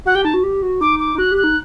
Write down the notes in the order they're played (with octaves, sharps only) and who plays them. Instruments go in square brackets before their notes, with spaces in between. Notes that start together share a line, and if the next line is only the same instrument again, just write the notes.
[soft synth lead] F#4 [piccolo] F#5
[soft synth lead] G4 [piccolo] G5
[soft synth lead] D#4 [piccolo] A5
[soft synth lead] F#4
G4
F#4
[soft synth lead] D#4 [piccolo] D6
[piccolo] D6
[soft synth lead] D#4
[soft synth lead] F#4 [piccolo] F#6
[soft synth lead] G4
[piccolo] F#6
[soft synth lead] D#4